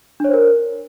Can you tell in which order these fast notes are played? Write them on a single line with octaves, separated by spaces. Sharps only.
D4 C#5 C5 A#4